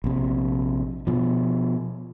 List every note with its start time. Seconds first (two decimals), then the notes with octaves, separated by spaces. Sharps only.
0.04 A#1 C3
1.07 B2 F3